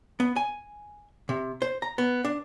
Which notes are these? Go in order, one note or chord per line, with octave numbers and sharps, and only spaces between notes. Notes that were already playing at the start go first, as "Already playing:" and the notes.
B3
G#5
C3
C5
A#5
B3
D4